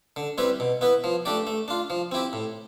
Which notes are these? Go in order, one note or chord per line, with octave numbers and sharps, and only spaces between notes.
D3
G3 C4 E4 B4
B2
B3 E4 B4
F3
A3 D4 G4 D5
A3
D4 F4
F3
C4 E4 G4
A2